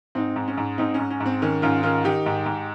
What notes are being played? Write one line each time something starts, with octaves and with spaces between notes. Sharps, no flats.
G#2 C4 D#4
G#2
C#4
G#2
G#2 C4 D#4
G#2 C#4
C#4
G#2
C4
D#3 C#4
G#2 C#4 F4
D#3 C#4 F4
D#3 D#4 G4
G#2
G#2